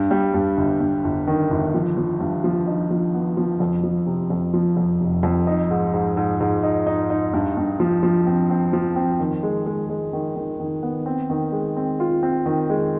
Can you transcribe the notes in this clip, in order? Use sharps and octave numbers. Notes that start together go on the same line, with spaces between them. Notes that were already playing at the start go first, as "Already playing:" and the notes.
Already playing: G2
G3
G2
G1
G2
G1
D#3
G1
F3
F3
G2
F3
D#4
F3
B3
F3
F2
F3
C3
F2
F3
F2
F1
F2
D#4
G#2
G#2
G#2
G#2
D#4
D#4
D#4
G2
G2
F3
F3
C4
C4
F3
C4
D#3
G#3
G#3
G#3
D#3
D#3
D#3
B3
C4
D#3
G#3
C4
F4
C4
D#3
G#3